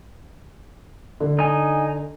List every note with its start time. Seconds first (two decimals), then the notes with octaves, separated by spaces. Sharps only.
1.20 D3
1.39 D#4 G#5